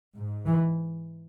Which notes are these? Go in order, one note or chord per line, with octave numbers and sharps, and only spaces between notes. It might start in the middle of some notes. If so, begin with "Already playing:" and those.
G#2
E3